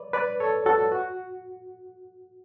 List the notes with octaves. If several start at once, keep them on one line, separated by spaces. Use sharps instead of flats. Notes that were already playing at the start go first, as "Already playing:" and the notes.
Already playing: B4 C#5 D5
B4 D5
A4 C#5
F#4 A4
F#4